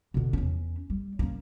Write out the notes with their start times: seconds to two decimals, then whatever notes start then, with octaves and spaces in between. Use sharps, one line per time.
0.14 B2 D3
0.33 E2 C#4
0.90 G3
1.19 A#3 C#4